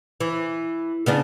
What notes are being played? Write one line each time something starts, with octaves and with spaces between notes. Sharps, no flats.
E3
C#3 B3 D4